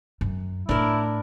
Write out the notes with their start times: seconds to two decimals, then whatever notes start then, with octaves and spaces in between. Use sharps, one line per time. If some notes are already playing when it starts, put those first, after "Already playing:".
0.21 F#2
0.69 A2 D4 E4 A#4